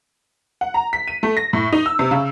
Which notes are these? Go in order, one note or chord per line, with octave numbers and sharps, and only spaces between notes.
F#5
A#5
B6
D#7
A3
A#6
A2
D#4
E6
C3
C#3